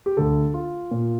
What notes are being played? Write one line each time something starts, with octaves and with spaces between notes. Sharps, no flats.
G4
D2 D3 A4
F4
A#2